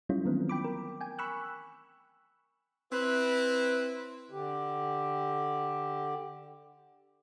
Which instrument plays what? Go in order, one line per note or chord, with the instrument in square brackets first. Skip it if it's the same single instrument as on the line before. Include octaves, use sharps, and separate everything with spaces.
[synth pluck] F#3 G3 A3 C#4 E4 F4
D#3 E3 A3 B3 C4
G5 B5 D6
A#4
G5 G#5
B5 C#6 E6 F#6
[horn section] C4 E4 [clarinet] B4
[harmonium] D3 G4